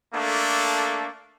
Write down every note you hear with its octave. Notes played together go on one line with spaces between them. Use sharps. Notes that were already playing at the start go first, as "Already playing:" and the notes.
A3 A#3 D4 A4